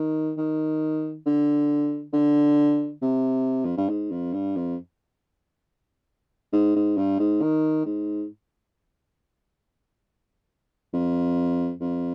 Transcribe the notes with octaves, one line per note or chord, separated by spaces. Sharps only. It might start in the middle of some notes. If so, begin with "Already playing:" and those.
Already playing: D#3
D#3
D3
D3
C3
F2
G2
G#2
F2
G2
F2
G#2
G#2
G2
G#2
D#3
G#2
F2
F2